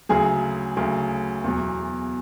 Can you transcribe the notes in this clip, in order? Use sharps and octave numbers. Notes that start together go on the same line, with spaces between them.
D2 C#3 F#3 G#4
D2 C#3 F#3
E2 B2 F#3